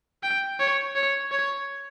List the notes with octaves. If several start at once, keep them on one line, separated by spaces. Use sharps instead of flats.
G5
C#5
C#5
C#5